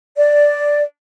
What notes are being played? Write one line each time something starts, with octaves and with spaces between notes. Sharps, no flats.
D5